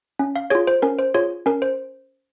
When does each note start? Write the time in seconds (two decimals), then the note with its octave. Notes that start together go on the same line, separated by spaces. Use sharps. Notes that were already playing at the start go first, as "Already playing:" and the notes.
0.19 C#4
0.36 F5
0.50 F4 G#4 C#5
0.67 C5
0.82 C#4 A#4
0.99 C5
1.14 F4 G#4 C#5
1.46 C#4 A#4
1.62 C5